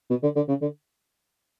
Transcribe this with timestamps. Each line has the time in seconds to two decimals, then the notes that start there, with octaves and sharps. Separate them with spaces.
0.10 B2
0.23 D3
0.36 D3
0.49 C#3
0.61 D3